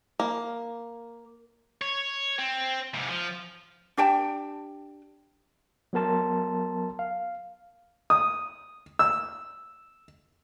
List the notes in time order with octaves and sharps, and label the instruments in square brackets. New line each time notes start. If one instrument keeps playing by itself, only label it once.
[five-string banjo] A#3
[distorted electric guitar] C#5
C4
G#2 C3
F3
[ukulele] D4 G4 G5 A5
[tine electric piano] F#3 B3 A#4 A5 C6
F5
[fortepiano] D#6
E6